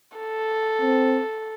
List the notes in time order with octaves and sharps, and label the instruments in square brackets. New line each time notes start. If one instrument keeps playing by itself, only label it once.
[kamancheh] A4
[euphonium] C4